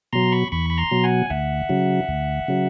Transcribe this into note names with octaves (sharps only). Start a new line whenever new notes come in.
B2 F#3 A#5 C6
B5 C#6
E2 B5 C#6
B5
A#5 C6
B2 F#3
F#5 G#5
D2 E5 F#5
C#3 F#3
D2
C#3 F#3